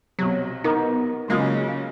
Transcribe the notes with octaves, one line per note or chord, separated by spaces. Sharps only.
B1 C3 F#3
B3 D#4 A#4 C#6
C#3 F#3 G#3 A#3 F4